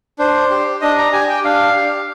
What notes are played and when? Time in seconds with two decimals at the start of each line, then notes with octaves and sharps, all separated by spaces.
0.19 D4 C5
0.51 G4
0.81 D4 D#5
0.98 A#5
1.13 G4 G#5
1.29 G5
1.44 D4 F5
1.76 G4